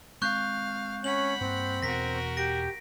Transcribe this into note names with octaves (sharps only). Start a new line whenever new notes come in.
G#3 C4 F5 C#6 F#6 G6
C#4 F#5 B5 F#7
G2 A#3 C4
E2 B2 F#4 A#4 A#6 B6
G4 A#6 D7